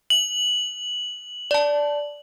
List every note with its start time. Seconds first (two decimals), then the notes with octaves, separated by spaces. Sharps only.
0.10 F#7
1.51 D5 A5